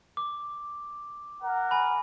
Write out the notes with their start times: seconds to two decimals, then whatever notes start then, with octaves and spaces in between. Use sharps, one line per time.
0.17 D6
1.42 A#4 F#5
1.71 G#5 B5